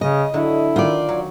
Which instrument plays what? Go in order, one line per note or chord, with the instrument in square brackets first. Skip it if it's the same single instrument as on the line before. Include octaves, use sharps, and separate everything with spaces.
[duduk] C#3 [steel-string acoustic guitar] D#5
[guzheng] D3 F#3 A3 [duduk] E4
[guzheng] D#3 [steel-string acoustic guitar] F4 D5
[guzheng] F#3